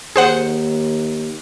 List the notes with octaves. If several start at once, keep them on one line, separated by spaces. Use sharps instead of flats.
D#2 G#4 C5 F#5